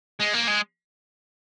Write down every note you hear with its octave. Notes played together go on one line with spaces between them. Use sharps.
G#3
A#3
G#3